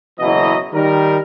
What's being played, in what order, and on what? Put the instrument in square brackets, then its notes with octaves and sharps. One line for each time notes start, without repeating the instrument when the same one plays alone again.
[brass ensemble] F#1 B2 E3 F#3 D#5
D#3 G3 A#4